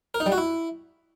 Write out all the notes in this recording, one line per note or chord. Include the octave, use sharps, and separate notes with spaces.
A#4
D#4
G3
F#4
E4